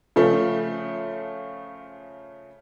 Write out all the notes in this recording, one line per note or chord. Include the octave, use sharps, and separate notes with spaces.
C#3 F3 A3